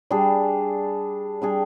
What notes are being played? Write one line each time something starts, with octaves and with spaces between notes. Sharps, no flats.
G3 D4 G#4
G3 D4 G#4